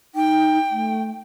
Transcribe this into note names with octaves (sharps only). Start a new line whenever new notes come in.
D#4 G5
A3